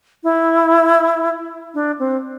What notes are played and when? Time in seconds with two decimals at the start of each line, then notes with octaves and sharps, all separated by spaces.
0.24 E4
1.74 D4
1.99 C4